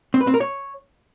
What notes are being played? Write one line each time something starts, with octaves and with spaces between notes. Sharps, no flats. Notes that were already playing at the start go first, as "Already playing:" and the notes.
C4
B4
C4
A#4
C#5